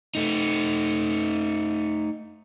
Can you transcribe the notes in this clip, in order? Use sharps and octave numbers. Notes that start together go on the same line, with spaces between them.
A3 D#4